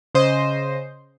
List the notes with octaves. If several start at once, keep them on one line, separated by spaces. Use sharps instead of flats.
C#3 C5 D#5